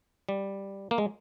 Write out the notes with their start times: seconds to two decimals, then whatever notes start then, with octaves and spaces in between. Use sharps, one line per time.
0.29 G3
0.91 A#3
0.98 G#3